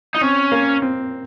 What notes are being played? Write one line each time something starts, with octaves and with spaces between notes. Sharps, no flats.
D#4
C4 C#4
A#3
C4